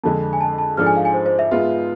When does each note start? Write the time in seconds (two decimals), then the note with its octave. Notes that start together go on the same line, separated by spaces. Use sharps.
0.04 F2 D3 G#3 A5
0.33 G#5
0.41 A5
0.58 A5
0.77 G#2 F3 G#3 D4 A4 F6
0.86 G#5
0.96 F5
1.05 G#5
1.14 C5
1.26 C5
1.39 E5
1.51 G#2 G#3 B3 F4